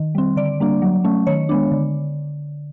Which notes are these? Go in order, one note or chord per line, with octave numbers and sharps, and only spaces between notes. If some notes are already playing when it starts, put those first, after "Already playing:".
Already playing: D#3
G3 C4
D3 D5
G3 A#3 D4
F#3
A3 C#4
D#3 C#5
G#3 B3 D4
D3